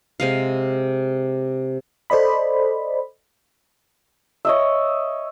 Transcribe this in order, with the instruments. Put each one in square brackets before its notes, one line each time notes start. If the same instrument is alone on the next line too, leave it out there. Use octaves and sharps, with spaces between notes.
[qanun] C3 G#3 F5
[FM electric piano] A4 C5 D5 D#5 B5
[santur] C#5 D#5 E5